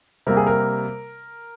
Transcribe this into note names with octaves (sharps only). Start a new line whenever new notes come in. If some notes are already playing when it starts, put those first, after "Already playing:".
C3 G3 A#3 A#4
G#4
A#4